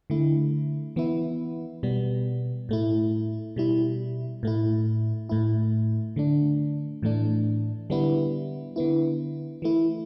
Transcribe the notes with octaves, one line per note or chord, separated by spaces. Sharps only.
D3 A3 E4
E3 B3 E4
B2 G3 B3
A2 A3 E4
B2 G3 E4
A2 A3 E4
A2 A3 E4
D3 A3 D4
A2 E3 A3 D4
D3 G3 B3 E4
D3 B3 E4
E3 A3 E4